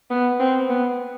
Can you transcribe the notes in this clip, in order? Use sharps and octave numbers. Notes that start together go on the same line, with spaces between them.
B3
C4
B3